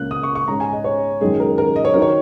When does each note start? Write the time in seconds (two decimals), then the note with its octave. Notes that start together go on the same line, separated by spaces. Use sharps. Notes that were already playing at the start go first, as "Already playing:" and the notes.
Already playing: C#2 C#3 A#3 C#4 F#6
0.11 D#6
0.23 C#6
0.35 C#6
0.48 G#2 G#3 C#4 A#5
0.60 G#5
0.73 D#5
0.84 C#5
1.21 F#1 F#2 D#3 G#3 C#4 G#4
1.40 A#4
1.58 A#4
1.76 D#5
1.85 C#5
1.94 D#3 F#3 D#4 A#4
2.02 C#5